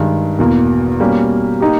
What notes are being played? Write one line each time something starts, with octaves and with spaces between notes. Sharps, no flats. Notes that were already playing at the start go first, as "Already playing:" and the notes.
Already playing: G2 D#3 G#3
E2 B2 A#3
B2 G3 A#3 C#4 G4
A#3 D#4 G4